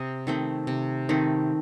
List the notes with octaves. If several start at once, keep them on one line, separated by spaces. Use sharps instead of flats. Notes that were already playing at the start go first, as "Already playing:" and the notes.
Already playing: C3 D#5
D#3 A3 C4
C3
D#3 A3 C4